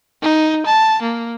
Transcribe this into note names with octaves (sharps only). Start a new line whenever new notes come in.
D#4
A5
A#3